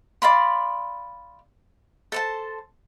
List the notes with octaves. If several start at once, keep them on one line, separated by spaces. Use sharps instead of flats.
D5 F5 B5 C6
A4 C5 A5